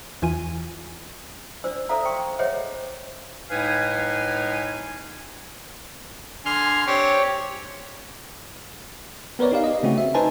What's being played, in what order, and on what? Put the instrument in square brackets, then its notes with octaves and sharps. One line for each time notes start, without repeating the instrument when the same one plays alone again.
[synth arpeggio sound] E2 E3 F4 G#5 D#7
[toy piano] D4 C5 D5 E6
A4 C5 D5 E5 F5 A#5
G5 C6 C#6
G#4 C5 C#5 D#5 E5 F#5
[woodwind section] A2 G#3 D#4 B4 F5 G#5
[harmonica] D3 G#5 [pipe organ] C6 F6
[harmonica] C4 D4 [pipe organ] G4 C#5
[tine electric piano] B3 A#4 B4 C#5 D5
D#4 G4 F5
D#5
C#3 A3 C4 C#4 F#4
E5
D#4 B4 C5 G#5 A5